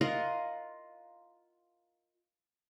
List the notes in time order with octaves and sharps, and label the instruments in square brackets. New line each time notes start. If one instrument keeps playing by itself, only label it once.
[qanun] F4 A#4 D#5 F#5